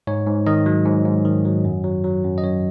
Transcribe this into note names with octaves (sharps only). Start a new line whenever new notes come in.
G#2 C#5
G#2
D#3 D#5
F#3
G#2
G#2
D#3
F#3
F#2
F#3
F#3
F#2
D#5
F#2 C#5